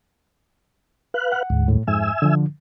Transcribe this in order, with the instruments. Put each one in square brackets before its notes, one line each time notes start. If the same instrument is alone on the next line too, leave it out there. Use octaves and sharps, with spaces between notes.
[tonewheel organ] B4 F5 F#6
[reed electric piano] F#5
[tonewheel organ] D2 G#2
[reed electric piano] A2
[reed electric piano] F2 G#2 [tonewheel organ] E5 G#5 E6
[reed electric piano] D3 F3